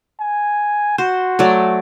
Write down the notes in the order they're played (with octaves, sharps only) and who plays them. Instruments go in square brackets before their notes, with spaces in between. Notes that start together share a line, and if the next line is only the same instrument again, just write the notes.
[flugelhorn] G#5
[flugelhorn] F#4 [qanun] C5
[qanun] F#3 A3 D5